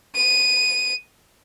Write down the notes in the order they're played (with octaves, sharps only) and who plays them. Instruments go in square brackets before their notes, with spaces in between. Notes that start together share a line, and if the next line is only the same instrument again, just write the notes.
[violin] D#7